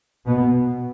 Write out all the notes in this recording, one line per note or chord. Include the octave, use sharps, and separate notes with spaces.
B2 B3